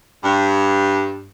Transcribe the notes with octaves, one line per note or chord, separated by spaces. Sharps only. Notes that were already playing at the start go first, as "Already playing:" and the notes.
G2